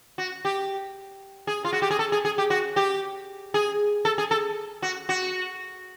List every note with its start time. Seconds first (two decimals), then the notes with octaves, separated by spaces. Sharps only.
0.18 F#4
0.45 G4
1.47 G#4
1.65 F4
1.73 F#4
1.82 G4
1.91 G#4
1.99 A4
2.12 G#4
2.25 G#4
2.38 G4
2.50 F#4
2.76 G4
3.54 G#4
4.05 A4
4.18 G#4
4.31 A4
4.82 F#4
5.09 F#4